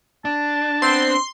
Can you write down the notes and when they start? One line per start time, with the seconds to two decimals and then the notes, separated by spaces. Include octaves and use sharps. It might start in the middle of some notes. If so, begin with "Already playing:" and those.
0.25 D4 A5
0.82 B3 C4 C6